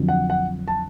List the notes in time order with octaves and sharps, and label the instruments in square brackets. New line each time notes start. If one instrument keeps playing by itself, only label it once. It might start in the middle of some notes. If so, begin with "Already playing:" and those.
Already playing: [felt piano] F2 D3 F#3
[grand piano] F#5
F#5
A5